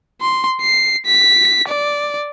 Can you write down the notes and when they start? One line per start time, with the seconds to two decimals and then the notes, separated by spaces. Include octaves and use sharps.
0.21 C6
0.62 C7
1.07 B6
1.68 D5